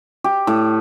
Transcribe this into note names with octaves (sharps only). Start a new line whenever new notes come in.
G4
A2